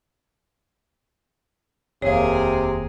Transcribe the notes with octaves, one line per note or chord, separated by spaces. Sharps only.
F1 D#2 C3 A#3 G#4 A#4 C#5 F5